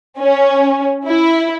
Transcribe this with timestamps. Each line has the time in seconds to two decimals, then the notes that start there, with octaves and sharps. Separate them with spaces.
0.19 C#4
1.07 E4